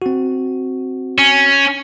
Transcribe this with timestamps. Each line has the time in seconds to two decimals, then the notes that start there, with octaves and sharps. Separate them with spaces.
0.02 C4 F#4
1.19 C#4